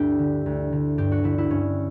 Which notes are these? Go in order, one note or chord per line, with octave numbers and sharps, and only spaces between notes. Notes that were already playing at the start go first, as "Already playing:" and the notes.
Already playing: D2 G2 D4 E4 G4
D3
D2
D3
G2 G4
F#4
D3 E4
E4
G2 C#4